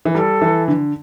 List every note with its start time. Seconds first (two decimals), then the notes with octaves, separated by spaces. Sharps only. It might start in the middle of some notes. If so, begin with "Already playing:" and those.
0.05 E3
0.15 G3 A4
0.42 E3
0.68 D3